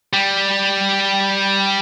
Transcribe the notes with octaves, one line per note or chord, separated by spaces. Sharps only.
G3